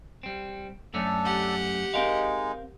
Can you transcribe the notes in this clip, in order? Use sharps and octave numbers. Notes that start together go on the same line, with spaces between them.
G3 C4
F#2 A3 C#4 D4 A4
G4 F#5
G#3 C4 D#4 A#4 F5